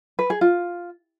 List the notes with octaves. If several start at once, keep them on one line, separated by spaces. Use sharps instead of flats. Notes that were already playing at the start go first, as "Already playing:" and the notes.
B4
G#4
F4